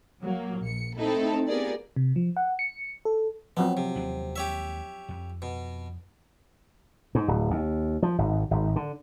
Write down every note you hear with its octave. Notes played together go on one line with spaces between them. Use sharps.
F#3 A#3
A#1 C#7
A3 C4 D#4 E4 A4
B3 F4 G4 G#4 A#4 D5
C3
F3
F#5
C#7
A4
F3 F#3 B3 C4
C3
D#2 G#3 D4
G4 C#5 E5
F2
B2
G#2
D1
D#2
F3
G#1
G#1
D3